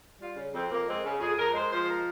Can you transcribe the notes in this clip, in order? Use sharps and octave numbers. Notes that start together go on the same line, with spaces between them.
G3 F4
C#3 C#4
F2 C4
F2 A#3
G#3 C4
C#3
F2 G#4
F2 A#4
G#3 C5
F3 C5
A#4